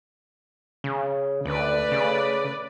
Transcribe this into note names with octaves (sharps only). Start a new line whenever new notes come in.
C#3
D2 A3 B4 D5
C#3